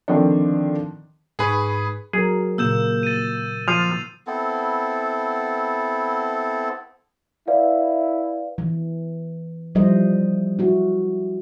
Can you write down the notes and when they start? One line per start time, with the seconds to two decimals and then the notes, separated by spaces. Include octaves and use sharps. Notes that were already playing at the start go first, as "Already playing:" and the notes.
0.08 D3 D#3 F3 C4 D4
1.39 G#2 G#4 B4 B5 C#6
2.13 F#3 G#4 A#4
2.58 A#2 C#3 A#3 E6 G6 E7
3.03 A6 D#7
3.68 F3 C7 D#7 F7
4.27 B3 C4 E4 A4
7.48 E4 B4 D5 F5
8.58 E3
9.75 F3 G3 E4 C5 D#5
10.59 E4 F#4